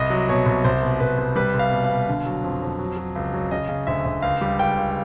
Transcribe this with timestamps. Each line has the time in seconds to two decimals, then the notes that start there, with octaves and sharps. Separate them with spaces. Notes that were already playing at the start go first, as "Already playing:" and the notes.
Already playing: C2 D#5
0.10 F#3
0.29 B2 C#5
0.46 C2
0.64 C2 C5
0.83 B2
1.00 C2 B4
1.18 C2
1.36 G3 B4
1.54 C2
1.59 F5
1.71 B2
1.84 F5
1.90 B2
2.08 D3
2.26 F#3
2.44 F2
2.62 F2
2.79 F#3
2.97 F#3
3.16 C#2
3.34 F#3
3.51 C#3 D#5
3.69 C#3
3.87 D2 E5
4.05 D2
4.22 C#2 F5
4.41 G3
4.59 C#2 G5
4.77 C#2